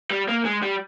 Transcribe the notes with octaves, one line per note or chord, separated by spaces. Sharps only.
G3
A#3
G#3
G3